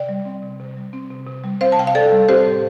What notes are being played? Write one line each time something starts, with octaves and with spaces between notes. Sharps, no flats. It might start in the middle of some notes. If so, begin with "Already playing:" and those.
Already playing: C3 D5 G5
G3
C4
C3
C3
G3
C4
C3
C3
G3
C4 C5 F5
A5
C3 G5
F5
C3 A4 D5
G3
C4 G4 C5
A2